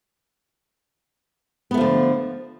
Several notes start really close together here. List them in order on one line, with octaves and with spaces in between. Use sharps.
B3 A3 F3 D3